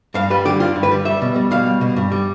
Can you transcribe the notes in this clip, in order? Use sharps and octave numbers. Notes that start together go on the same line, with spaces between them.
G2 F5
G3 B4
D3 G4
G2 F4
G2
B4
G3
G3 E5
B2
G3
B2 F5
G3
B2
G2
G3